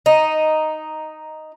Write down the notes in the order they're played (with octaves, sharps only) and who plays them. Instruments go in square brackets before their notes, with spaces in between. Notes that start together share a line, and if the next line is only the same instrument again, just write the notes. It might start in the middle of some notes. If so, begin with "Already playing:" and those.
[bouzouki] D#4